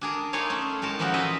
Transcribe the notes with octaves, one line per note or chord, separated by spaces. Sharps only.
D4 G#4 A#4
A#3 D#4 F4 G#4 C#5 F5
A3 C#4
A2 G#3 D#4 A#4 A5
E3 F3 A#3 C#4 D#4 F#4
F4 G#4 D#5 E5